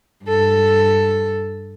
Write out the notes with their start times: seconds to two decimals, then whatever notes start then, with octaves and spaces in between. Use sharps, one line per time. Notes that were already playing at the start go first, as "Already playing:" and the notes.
0.25 G2 A4